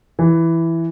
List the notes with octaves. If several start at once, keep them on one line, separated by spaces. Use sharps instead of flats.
E3